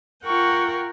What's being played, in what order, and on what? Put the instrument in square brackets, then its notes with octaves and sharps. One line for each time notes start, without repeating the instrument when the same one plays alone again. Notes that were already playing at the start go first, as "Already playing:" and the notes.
[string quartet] F4 A#4 F#5 G5 C#6